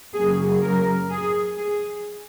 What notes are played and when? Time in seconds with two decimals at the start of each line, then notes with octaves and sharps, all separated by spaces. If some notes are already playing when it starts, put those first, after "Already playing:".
0.14 F#2 C#3 F#3 A#3 G#4
0.62 A#4
1.10 G#4
1.58 G#4